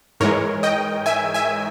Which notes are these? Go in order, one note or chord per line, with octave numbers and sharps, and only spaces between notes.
G#2 E3 G#3 A#4 C#5
D#5 G5
E5 G#5
E5 G#5